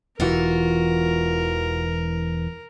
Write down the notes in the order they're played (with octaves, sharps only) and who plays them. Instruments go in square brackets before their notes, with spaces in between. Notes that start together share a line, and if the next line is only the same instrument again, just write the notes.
[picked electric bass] E1 E3 [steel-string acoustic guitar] F4 F#4 [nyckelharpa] A#4